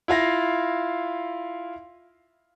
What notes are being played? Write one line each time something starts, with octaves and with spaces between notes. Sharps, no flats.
E4 F4 F5 A#6